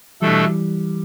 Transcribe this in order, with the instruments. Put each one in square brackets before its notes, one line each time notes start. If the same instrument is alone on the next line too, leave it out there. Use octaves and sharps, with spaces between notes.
[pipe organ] B2 A3 D4 A4 [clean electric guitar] E3 G3